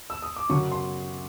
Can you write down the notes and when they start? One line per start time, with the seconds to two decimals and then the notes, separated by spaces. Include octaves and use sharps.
0.10 E6
0.22 D#6
0.36 D6
0.50 F#2 C#3 F#3 C#6
0.72 C6